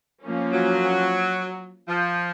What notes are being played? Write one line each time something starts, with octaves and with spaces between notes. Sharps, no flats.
F3 A#3 C#4
F#3
F3